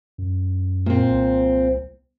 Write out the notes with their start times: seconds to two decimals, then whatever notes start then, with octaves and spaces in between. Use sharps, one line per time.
0.18 F#2
0.86 A#2 C4
1.10 C2